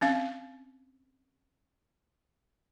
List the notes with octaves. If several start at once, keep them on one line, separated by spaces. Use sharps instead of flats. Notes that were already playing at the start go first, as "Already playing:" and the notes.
C4 C#4 F5